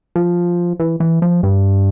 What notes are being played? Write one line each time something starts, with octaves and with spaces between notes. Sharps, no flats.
F3
E3
E3
F3
G2